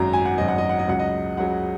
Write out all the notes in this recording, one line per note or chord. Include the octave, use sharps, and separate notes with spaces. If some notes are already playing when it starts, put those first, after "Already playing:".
Already playing: G#1 F#2 F#3 A#5
G#5
F#5
G#1 F#2 F#3 D#5
F#5
D#5
F#5
D#5
C#2 C#3 F#3 F#5
D#5
C#2 C#3 F#3 F#5